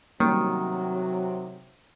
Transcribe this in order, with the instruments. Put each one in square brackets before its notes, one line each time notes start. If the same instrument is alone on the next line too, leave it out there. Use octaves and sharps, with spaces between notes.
[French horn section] C3 F#3 [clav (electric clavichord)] D#3 [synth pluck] G3 A#3 C#4